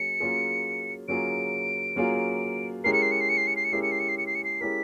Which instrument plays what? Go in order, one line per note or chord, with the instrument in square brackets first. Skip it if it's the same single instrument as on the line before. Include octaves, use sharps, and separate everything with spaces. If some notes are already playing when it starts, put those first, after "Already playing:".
Already playing: [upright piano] F#3 A#3 C#4 G#4 [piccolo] C#7
[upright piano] F#3 A#3 C#4 F4 G#4
[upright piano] F#3 A#3 C#4 F4 G#4 [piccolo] D7
[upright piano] F#3 A#3 C#4 F4 G#4
[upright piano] G#3 C#4 E4 G4 A#4 [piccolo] C7
[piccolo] C#7
C7
C#7
C7
C#7
C7
C#7
C7
C#7
[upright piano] G#3 C#4 E4 G4 A#4 [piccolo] C7
[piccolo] C#7
C7
C#7
C7
C#7
C7
C#7
C7
[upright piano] G#3 C#4 E4 G4 A#4 [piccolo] B6